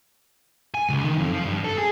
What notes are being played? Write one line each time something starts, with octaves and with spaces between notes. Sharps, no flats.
G#5
C#2
D#3
F2
F3
G2
A4
G#4